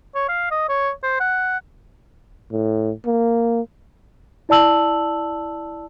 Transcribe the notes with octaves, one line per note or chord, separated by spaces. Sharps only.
C#5
F5
D#5
C#5
C5
F#5
A2
A#3
E4 D5 A5 E6 F#7